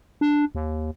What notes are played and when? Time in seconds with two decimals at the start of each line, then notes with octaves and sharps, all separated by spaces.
0.21 D4
0.55 D#2